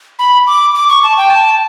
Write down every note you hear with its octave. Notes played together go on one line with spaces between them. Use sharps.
B5
D6
D6
C#6
A5
G5
A5